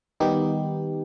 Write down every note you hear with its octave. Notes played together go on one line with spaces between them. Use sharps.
D#3 G3 B3 D#4 G4